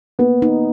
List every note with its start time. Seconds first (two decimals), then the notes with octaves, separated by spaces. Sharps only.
0.19 A#3 B3
0.42 D#4